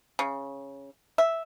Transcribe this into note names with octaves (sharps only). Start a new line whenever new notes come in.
C#3
E5